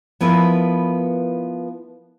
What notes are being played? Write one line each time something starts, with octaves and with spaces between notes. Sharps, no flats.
F3 B3 E4 A#4 B4